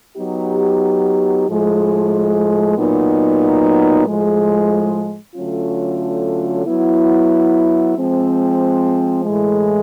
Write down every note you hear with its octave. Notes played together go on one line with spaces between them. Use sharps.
F#3 B3 D#4 G4
A2 F3 G#3
A#2 F#3 B3 D#4
A2 F3 G#3
D3 F#3 A3 C#4 F4
F#3 B3 E4
F3 G#3 C4
A2 E3 G#3